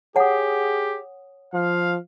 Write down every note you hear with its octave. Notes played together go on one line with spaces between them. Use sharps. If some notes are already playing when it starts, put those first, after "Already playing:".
G4 G#4 C#5 F#5 G#5 D#6
F3 F5